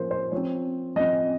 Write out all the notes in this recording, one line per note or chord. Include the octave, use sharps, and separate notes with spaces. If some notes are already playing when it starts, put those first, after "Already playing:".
Already playing: F3 A#3 C#4 A#4 C5
C5
F3 C4 C#5
F3 C4 D#5